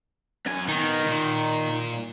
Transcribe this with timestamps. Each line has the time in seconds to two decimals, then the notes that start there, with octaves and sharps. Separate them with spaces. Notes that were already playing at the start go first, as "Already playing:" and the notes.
0.46 F#2 G#5
0.69 D#3 B3 D#4
1.07 A#2